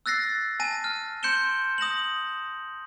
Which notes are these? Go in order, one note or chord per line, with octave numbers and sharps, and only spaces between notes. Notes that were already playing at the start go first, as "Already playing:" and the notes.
E6 F#6 A6 A#6 C7
G#5 A5 A#6 D#7
F6
C6 G6 C#7 D7 E7 G7
D#6 A#6 E7 F#7